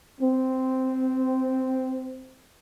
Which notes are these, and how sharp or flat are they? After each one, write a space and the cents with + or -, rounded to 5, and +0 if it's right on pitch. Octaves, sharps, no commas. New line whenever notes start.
C4 -10